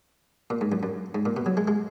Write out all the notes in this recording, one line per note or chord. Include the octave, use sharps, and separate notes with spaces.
A#2
G#2
F#2
F#2
G#2
A#2
B2
F#3
G#3
G#3